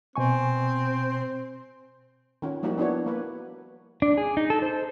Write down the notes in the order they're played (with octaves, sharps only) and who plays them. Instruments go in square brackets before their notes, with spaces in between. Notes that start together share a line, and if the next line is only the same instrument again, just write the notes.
[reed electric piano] B2 G#5 C#6 [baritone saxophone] C4
[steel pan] D#3 C#4 F4
F3 G3 A#3 D#4 E4 F#4
B3 D4 E4 F#4 C#5
A#3 B4
[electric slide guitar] D4
G#4
D#4
A4
C5